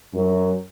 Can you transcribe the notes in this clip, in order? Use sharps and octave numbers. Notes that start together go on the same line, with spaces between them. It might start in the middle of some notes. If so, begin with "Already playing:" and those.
F#2